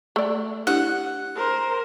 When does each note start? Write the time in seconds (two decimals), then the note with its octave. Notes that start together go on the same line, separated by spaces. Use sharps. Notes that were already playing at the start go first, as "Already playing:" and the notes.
0.16 A3 D5
0.67 D4 E4 G4 F#5
1.35 A#4 C5